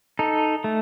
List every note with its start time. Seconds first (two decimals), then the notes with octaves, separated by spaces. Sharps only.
0.19 D#4 A4
0.64 A3